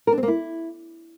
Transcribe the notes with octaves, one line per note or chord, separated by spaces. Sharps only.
A#4
D4
C4
A#3
E4